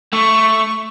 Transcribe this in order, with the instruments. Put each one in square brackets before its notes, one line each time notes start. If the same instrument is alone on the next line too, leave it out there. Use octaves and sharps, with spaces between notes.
[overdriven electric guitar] A3 [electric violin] C#6